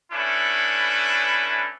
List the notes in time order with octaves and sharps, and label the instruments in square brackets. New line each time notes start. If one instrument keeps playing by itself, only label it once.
[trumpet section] A3 C#4 D4 E4 B4